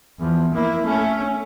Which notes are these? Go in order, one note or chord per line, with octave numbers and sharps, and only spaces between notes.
E2 F3
A#3 E4
A3 C#4